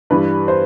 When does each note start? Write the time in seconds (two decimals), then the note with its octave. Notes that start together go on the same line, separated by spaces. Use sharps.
0.10 G2 E3 G3 B4
0.48 C5